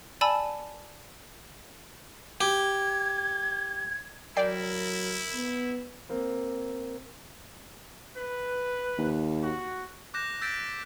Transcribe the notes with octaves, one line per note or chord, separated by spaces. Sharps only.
D5 G#5 A5 B5 E6
G4 G#6
F#3 E4 A#4 D5 G5 C7
B3
A#3 C4
B4
D#2
F#4
D6 F#6 G6 A#6 E7
E6 G6 A6 B6 D7